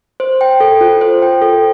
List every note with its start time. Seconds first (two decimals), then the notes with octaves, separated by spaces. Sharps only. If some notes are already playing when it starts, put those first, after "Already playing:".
0.20 C5
0.41 G5
0.60 A4
0.81 F4
1.01 C5
1.22 G5
1.42 A4